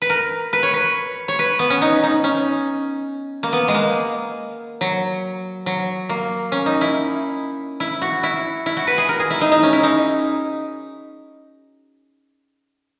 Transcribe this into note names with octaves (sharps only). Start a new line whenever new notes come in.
B4
A#4
B4
C#5
B4
C#5
B4
B3
C#4
D#4
D#4
C#4
A#3
B3
G#3
A#3
F#3
F#3
A#3
C#4
D#4
E4
E4
F#4
E4
E4
F#4
B4
G#4
A#4
G#4
E4
D#4
D#4
C#4
E4
D#4